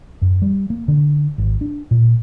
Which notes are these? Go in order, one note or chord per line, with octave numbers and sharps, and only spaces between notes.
F#2
G3
A#3
D3
G#1
D4
A#2